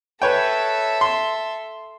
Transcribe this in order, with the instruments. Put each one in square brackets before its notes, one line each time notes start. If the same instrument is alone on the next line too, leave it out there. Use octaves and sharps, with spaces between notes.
[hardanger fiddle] A4 E5 [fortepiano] B4 C#5 G5
[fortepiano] C6